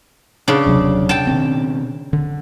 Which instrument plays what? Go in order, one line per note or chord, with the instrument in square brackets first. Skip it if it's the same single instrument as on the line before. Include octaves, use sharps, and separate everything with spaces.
[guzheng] C#3 D4
[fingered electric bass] D#1 C3 F#3
[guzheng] G5 A5
[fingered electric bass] B2 D#3 C4
D3